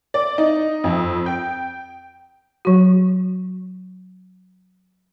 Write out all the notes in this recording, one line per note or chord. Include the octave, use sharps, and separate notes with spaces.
D5
D#4
F2
G5
F#3 F#4